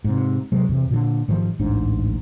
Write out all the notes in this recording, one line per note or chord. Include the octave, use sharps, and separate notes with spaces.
G#2 C3
C3 F#3 G#3
E2 C3
A#2 D3
G#2 D#3 F3 G3
D1 A1 G#2 D4